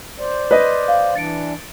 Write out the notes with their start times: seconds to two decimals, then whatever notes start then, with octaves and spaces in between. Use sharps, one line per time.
0.18 C5 D5
0.51 B4 D#5
0.88 F5
1.15 E3 D4 A6 C#7 D7